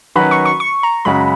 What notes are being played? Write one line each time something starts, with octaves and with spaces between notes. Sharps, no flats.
D#3 F#3 C#4 F#4 B4 B5
C#6
C#6
C#6
A#5
F#2 C#3 G#3 C#4 F#4 B5